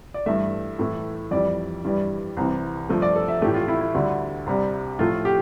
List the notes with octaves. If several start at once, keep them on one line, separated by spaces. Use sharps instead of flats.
D5
G2 E3 A3 E5
A2 E3 A3
F2 E3 G3 D5
G2 E3 G3
C2 C3 E3
G2 F3 A3
D5
A4
E5
A2 E3 A3 G4
F4
E4
E4
D2 D3 G3
C2 C3 G3
A2 F3 A3 F4
G4